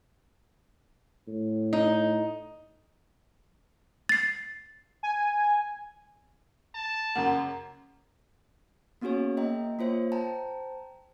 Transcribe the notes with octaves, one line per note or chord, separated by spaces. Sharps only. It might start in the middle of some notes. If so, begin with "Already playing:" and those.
A2
D#4
A6 C7
G#5
A5
F#2 C#3 A#3 F#5
A#3 B3 C#4 F#4 G#4 C#5
A#3 D#5 E5 G5 A#5
A#3 F4 C5 C#5 E5
C5 G5 A5 A#5